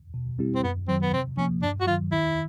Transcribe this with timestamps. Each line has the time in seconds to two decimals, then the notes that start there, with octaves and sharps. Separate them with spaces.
0.14 B2
0.39 G3 C4 E4 G4
0.55 C4
0.63 F#2 B3
0.88 D#3 F#3 C4
1.02 B3
1.13 C3 C4
1.37 F3 A#3 C#4
1.62 G2 D4
1.81 F#4
1.87 D#3 F#3 F4
2.11 D#3 E4